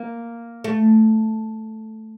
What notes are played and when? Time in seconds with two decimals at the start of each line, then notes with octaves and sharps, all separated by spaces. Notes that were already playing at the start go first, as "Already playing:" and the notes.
Already playing: A#3
0.64 A3